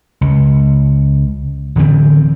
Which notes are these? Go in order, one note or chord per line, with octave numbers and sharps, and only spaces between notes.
C#2
D1 D3 E3 C4